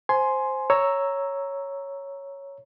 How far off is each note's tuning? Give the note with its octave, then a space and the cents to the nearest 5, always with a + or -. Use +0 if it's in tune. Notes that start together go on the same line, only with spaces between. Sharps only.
C5 +0 G#5 +20 C6 +0
C#5 +0 A#5 +0 E6 +0